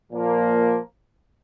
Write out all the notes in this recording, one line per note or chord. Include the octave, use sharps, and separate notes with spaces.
A#2 F3 A#3